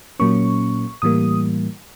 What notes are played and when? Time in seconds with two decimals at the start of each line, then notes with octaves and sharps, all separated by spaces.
0.19 A#2 F#3 A#3 C#4 C#6
1.02 A2 E3 G3 A#3 D#6